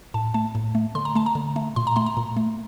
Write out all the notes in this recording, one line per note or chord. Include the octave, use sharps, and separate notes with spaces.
A2 A5
A3 A5
A2
A3
D3 C6
A#5
A3 A5
A#5
D3
A3
A#2 C6
A#5
A3 C6
A#5
A#2
A3